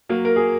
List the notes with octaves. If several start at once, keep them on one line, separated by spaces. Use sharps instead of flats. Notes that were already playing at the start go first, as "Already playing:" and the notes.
F#3 A#3
A#4
G#4